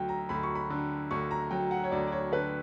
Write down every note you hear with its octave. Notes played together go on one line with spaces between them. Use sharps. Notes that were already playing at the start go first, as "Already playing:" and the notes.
Already playing: D2 F#3 G5
A#5
D2 B5
C#6
B5
D3
D2 C#6
A#5
F#3 G5
F#5
C#5
D2 D5
D5
C#5
D3 B4